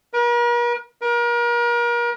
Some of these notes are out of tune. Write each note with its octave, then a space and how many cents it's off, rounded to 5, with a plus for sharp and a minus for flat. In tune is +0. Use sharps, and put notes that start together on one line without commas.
A#4 +45
A#4 +35